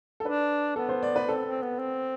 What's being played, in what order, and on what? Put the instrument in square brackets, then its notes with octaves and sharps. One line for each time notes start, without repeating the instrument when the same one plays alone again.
[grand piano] A4
[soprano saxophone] D4 [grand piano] B4
[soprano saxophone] B3 [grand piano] A4
[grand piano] C5
D5
B4
[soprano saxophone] C4 [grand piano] A4
[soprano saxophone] C4
B3
C4